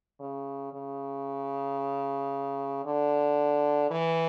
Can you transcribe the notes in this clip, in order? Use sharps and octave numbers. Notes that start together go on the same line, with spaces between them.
C#3
C#3
D3
E3